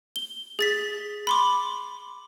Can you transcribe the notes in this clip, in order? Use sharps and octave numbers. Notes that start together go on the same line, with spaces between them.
G7
G#4 A6 B6
B5 C6 D6